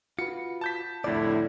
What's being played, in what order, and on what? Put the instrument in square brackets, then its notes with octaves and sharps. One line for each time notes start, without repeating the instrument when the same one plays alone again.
[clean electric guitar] F4 F#4 B4 [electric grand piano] C#7
[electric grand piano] A5 G6 B6
[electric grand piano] C2 F2 D3 [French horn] A2 [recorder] E4 [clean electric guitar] D5